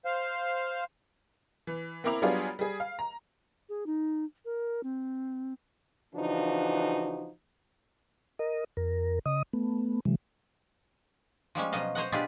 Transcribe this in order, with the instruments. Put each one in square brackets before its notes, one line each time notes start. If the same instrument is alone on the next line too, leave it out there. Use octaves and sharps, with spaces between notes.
[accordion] C5 F5
[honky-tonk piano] E3
A#3 C4 E4 A#4 D6 F7
F#3 G3 B3 D4 F4 G#4
G3 G#4
F5
A#5
[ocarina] G#4
D#4
A#4
C4
[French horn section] C#3 E3 F3 D4 D#4 F#4
[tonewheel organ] A#4 D#5
F2 A#4
C#3 D#5 D#6
A3 B3
C3 E3 F#3 G#3
[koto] F3 G3 G#3 C#4
B2 F3 F#3 D#5 F5
C5 C#5 D#5 F#5
B2 D4 F4 G4 G#4 B4